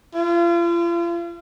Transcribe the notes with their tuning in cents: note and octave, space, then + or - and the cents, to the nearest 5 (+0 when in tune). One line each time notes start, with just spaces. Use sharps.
F4 -40